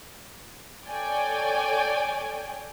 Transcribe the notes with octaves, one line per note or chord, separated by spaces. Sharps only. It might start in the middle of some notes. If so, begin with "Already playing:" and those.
A4 C#5 D5 G5 G#5